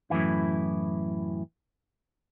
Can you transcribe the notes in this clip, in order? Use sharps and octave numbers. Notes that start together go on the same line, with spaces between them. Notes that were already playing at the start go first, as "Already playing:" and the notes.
F#2 A2 D3 E3 E4